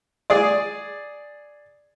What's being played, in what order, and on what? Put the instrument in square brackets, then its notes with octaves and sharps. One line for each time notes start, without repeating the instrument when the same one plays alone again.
[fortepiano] G#4 D5